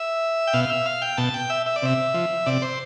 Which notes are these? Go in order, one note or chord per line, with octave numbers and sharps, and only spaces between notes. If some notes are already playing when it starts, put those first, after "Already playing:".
Already playing: E5
G5
B2 F5
E5
F5
G5
B2 A5
G5
E5
E5
D5
C3 E5
F3
C3 D5
C5